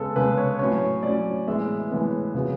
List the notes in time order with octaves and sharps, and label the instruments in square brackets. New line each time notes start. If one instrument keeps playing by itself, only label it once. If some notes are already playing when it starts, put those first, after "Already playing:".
Already playing: [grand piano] C#3 G#3 B3 A4
C#3 G#3 B3 B4
C#5
A2 F#3 C#4 C#5
A2 F#3 C#4 D5
A2 E3 G#3 B3 E5
A2 E3 G#3 B3
C#3 F#3 B3